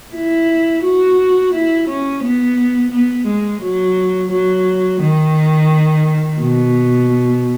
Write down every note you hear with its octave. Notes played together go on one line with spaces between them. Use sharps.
E4
F#4
E4
C#4
B3
B3
G#3
F#3
F#3
D#3
B2